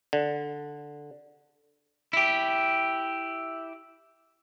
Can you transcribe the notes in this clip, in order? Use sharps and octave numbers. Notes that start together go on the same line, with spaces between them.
D3
E4 G4